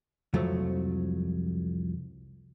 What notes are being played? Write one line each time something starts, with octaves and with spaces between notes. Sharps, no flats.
C2 F2 F3 F#3 A3